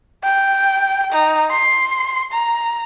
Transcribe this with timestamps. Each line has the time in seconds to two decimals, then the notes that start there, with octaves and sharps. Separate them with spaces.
0.24 G5
1.12 D#4
1.51 C6
2.32 A#5